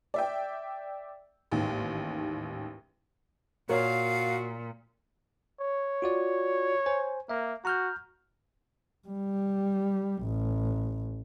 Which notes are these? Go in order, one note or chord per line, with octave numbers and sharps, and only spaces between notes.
D5 E5 G5
A1 D#2 G#2
A#2 F#4 A#4 C#5 F5
C#5
F4 F#4 D5
C5 G#5
A#3 E5
F#4 A#5 F6 G6
G3
A1